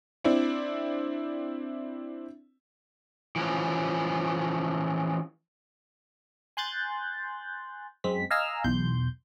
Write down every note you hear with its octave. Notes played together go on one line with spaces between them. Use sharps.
C4 D4 E4
E3 F3 C#4
G#5 C6 F#6 G6 A6
F#2 G#3 C4 B6
D#5 F5 G#5 A#5 E6 F6
B1 E2 C6 G6